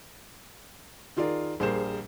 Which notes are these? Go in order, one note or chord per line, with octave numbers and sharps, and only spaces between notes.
D#3 F4 G#4 A#4 D5
A#1 G3 G#4 A#4 C5 E7